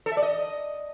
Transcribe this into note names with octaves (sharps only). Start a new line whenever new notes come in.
A4
E5
D5
D#5